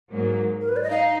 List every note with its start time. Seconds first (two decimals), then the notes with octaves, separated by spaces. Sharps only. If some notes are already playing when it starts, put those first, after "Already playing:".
0.12 G#2 F#3 A#3
0.61 A#4
0.69 B4
0.76 D5
0.83 D#5
0.90 D#4 F5